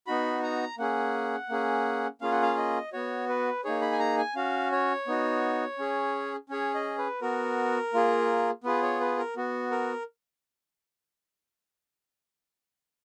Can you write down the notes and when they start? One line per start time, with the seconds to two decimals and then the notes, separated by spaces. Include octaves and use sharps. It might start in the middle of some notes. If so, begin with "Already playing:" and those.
0.07 B3 D#4 F#4 B5
0.43 A#5
0.78 A#3 C#4 G#4 F#5
1.49 A#3 C#4 G#4
2.21 A#3 C#4 F4 G#4 F5
2.31 F#5
2.42 F5
2.57 D#5
2.93 B3 F#4 C#5
3.29 B4
3.64 A#3 D#4 G#4 C#5
3.82 B5
3.92 G#5
3.99 A#5
4.18 G#5
4.35 C#4 F#4 F5
4.72 C#5
5.08 B3 D#4 F#4
5.79 C#4 G#4
6.50 C#4 G#4 C#5
6.75 D#5
6.98 B4
7.21 B3 F#4 A#4
7.94 A#3 F4 G#4
8.64 B3 F4 G#4 B4
8.82 C#5
9.01 B4
9.18 A#4
9.37 B3 F#4
9.71 A#4